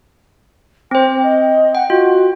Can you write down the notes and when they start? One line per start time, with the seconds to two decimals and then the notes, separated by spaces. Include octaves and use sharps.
0.91 C4 C5 G5
1.23 D#5
1.75 F#5 G5
1.90 F4 F#4